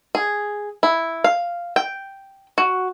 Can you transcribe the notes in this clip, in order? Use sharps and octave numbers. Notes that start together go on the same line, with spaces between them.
G#4
E4
F5
G5
F#4